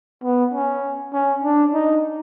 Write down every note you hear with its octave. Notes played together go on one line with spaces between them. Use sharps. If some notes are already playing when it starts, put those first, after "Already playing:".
B3
C#4
C#4
D4
D#4